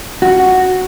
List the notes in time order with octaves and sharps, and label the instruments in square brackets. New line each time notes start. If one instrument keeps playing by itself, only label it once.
[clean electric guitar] F#4